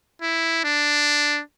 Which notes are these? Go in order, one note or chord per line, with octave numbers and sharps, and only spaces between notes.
E4
D4